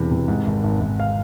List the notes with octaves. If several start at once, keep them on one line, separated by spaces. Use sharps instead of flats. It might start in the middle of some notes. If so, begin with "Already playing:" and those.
Already playing: E1 E2 C3 E3
C3
G#2
G#1
G#1
G#1
F5